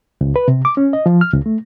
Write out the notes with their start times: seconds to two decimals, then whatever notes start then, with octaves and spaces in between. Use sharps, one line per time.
0.21 C#2
0.36 B4
0.48 C3
0.65 D6
0.77 C#4
0.93 D#5
1.06 F3
1.21 F6
1.33 C#2
1.46 A3